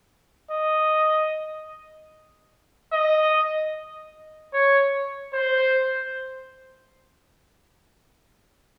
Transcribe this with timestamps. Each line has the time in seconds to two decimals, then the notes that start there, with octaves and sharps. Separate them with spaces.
0.51 D#5
2.93 D#5
4.54 C#5
5.33 C5